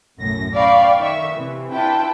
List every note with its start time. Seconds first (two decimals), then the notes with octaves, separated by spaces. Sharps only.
0.18 B1 F#2 A2 A#6
0.55 D5 F5 G5 B5 C#6
0.98 D#3 E5 C#6
1.32 C3 E3
1.72 D4 E4 F4 B4 G5 A5